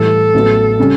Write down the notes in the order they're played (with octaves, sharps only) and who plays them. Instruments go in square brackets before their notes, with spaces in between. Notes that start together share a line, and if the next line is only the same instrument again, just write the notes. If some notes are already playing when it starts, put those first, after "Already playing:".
Already playing: [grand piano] A2 E3 G3 [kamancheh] A4
[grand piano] A1 A2 F#3 B3
C#3 G3 C#4